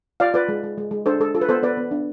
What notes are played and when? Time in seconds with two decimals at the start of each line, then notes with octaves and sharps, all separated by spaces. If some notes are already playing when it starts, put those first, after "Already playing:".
0.20 F4 D5 F5
0.34 F4 B4 D5
0.49 G#3
0.63 G#3
0.78 G#3
0.91 G#3
1.06 D4 A4 C5
1.20 G#3 A4
1.34 F4 A4
1.41 B4
1.49 B3 A4 C5
1.63 B3 B4 D5
1.77 B3
1.91 D4